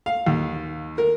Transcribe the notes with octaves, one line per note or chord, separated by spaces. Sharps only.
F5
D#2
A#4